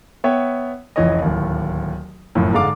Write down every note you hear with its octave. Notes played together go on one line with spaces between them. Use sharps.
B3 C#5 E5 G5
F1 C#2 E3 C#5 D#5
D1 D#2
F#1 F2 A2
G#2 D3 G#3 A4 F5 D6